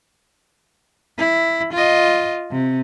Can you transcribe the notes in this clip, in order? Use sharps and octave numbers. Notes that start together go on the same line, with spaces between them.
E4
F4 D#5
C3